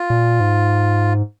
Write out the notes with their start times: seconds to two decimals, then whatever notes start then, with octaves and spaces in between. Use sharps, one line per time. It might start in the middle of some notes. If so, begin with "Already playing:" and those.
Already playing: F4
0.10 A#2
0.40 G#2